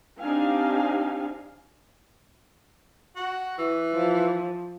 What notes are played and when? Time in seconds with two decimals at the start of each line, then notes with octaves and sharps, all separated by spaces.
0.20 C4 D4 D#4 G4 F5 G#5
3.16 F#4
3.58 E3
3.93 F3